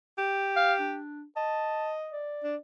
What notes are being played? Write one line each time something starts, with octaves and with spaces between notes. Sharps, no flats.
G4
F5
D4
D#5 A5
D5
D4